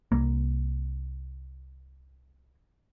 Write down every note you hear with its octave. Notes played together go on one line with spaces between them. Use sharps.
C2 A#3